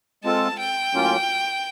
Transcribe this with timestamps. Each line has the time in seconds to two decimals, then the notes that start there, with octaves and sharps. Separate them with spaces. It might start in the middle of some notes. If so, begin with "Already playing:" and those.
0.24 G#3 C4 F4 A4 A5
0.59 G5
0.93 A2 F#3 A#3 C#4 F4